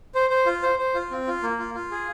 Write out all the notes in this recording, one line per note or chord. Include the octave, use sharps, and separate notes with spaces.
C5
C5
F4
C5
C5
F4
C4
F4
A#3
F4
F4
G#4